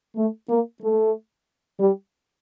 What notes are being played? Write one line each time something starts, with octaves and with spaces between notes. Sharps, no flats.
A3
A#3
A3
G3